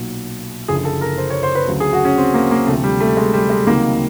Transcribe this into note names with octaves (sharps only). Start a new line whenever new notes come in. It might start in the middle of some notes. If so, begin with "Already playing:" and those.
Already playing: B1 A#2 F#3
F#1 F#2 D3 F3 G#4
A4
A#4
C5
C#5
C5
B4
D2 C#3 F#3
G#4
F#4
C#4
C4
A#3
A#3
D2 C3 F3 A3
G3
A3
G#3
G3
G#3
C#2 C3 D#3 F#3 A#3